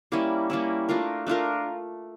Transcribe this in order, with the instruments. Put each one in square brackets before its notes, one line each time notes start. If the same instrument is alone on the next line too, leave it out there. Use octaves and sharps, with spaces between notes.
[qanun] G3 A#3 C#4 E4
G3 A#3 C#4 E4
A3 D4 F4 A#4
A3 D4 F4 A#4